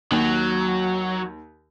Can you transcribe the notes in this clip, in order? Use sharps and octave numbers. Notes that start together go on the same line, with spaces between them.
D#2 F#3